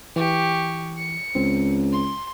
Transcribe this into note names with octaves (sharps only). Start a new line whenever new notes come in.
E3 G4 C#6
C#7
C#2 C4
C6